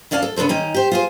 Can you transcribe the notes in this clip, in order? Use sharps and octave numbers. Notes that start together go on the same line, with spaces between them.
D2 C#4 D5 F5 G#5 A5
A4
C#3 B3 D4 A4 C5
D#3 C#4 D#4
G4 C5
F4 G#4 C5